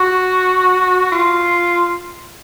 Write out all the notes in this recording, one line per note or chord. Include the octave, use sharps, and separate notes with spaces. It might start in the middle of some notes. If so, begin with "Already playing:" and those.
Already playing: F#4
F4